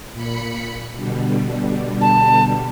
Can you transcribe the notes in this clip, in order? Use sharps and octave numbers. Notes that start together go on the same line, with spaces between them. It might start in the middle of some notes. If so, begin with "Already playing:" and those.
A#2 B5 C#7
B2 D3 G3
A5